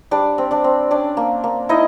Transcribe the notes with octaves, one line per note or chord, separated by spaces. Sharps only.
G3 D4 D5
C4
D4 D5
C4
C#4 D4 D5
A#3
A#3
D#4 E4 D#5